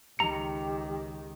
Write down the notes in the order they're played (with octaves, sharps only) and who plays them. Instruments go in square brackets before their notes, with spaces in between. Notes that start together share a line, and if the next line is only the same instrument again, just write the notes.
[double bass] C#2 D#3 [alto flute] G4 [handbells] A#5 C#7